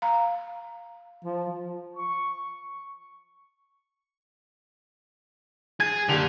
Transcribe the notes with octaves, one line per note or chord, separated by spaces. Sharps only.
F5 A#5
F3
C#6
G#4 G#6
F#1 D3 G4 F7